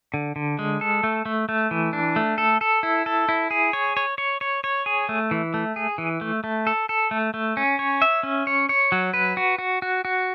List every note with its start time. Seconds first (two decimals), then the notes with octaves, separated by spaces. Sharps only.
0.14 D3
0.36 D3
0.59 G#3
0.81 A4
1.04 A3
1.26 A3
1.49 A3
1.71 E3
1.93 D4
2.16 A3
2.38 A4
2.61 A4
2.83 E4
3.06 A4
3.29 E4
3.51 G#4
3.73 C#5
3.97 C#5
4.18 C#5
4.41 C#5
4.64 C#5
4.86 G#4
5.09 A3
5.31 E3
5.54 A3
5.76 G#4
5.98 E3
6.21 A3
6.44 A3
6.67 A4
6.89 A4
7.11 A3
7.34 A3
7.57 C#4
7.79 C#5
8.02 E5
8.23 C#4
8.47 C#5
8.69 C#5
8.92 F#3
9.14 B4
9.37 F#4
9.58 F#4
9.82 F#4
10.05 F#4